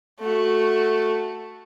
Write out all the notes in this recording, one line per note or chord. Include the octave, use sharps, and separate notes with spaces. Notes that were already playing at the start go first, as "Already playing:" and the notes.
A3 F#4